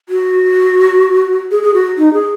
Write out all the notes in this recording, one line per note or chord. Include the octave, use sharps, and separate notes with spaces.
F#4
G#4
G#4
F#4
D#4
G#4